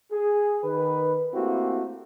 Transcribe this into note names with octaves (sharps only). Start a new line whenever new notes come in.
G#4
D#3 B4
A3 A#3 C4 E4 F#4 G4